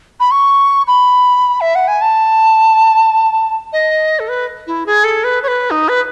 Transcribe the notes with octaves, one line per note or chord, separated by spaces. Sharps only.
B5
C#6
B5
E5
F#5
G#5
A5
D#5
A4
B4
E4
G#4
A4
B4
C#5
B4
D#4
B4